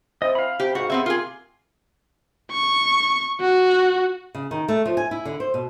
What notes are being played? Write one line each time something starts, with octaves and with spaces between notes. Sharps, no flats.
C4 E4 D#5
F5 B5
C3 G4
G#2 F#4
B3 C4 E5
A#3 F4 G4 G#4
C#6
F#4
C#3
D#3
A3
F3
G#5
E4
D3
C5
B2